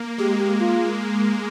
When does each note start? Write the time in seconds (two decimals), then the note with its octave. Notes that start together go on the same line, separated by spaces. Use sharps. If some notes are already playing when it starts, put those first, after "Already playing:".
Already playing: A#3
0.18 G#3 G4
0.39 G4
0.59 F4